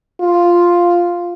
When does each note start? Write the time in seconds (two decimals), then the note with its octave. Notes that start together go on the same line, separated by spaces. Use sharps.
0.21 F4